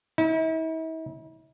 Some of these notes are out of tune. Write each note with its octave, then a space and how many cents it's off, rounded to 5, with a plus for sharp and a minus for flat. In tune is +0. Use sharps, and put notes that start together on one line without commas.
E4 -45